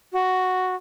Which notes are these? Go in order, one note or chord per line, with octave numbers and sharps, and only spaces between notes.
F#4